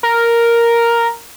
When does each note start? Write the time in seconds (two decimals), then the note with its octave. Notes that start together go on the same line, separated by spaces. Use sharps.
0.03 A#4